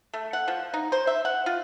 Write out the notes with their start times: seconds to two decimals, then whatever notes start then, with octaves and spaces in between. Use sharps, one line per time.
0.13 A3
0.33 F#5
0.48 F3
0.74 D#4
0.92 C5
1.07 E5
1.25 F#5
1.46 F4